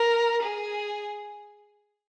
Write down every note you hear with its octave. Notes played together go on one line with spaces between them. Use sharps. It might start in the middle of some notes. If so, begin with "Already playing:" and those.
Already playing: A#4
G#4